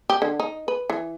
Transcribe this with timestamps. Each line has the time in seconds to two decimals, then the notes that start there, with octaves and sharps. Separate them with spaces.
0.10 G4
0.22 D3
0.40 D#4
0.68 B4
0.90 E3